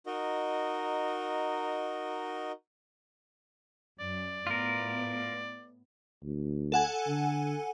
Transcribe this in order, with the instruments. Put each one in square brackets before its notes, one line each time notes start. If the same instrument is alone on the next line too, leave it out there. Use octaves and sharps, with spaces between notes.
[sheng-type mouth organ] D#4 F#4 A#4 D#5
[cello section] F#2 [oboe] D5
[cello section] A2 B3 [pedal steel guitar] F4 A#4
[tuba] D2
[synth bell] A4 F#5 G#5
[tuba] D3